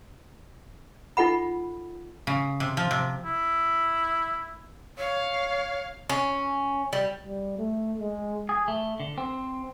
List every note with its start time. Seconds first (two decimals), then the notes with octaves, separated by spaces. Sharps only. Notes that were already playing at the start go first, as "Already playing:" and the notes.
1.17 D#4 F4 A4 F#5 B5
2.27 C#3
2.60 C3
2.77 F3
2.91 C3
3.25 E4
4.97 C#5 F5
6.10 C#4
6.93 G3
7.24 G3
7.58 A3
7.99 G#3
8.49 G#4
8.68 A3
9.00 D3
9.18 C4